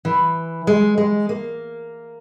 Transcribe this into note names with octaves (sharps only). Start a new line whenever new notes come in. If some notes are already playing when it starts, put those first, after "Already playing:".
E3
G#3
G#3
A#3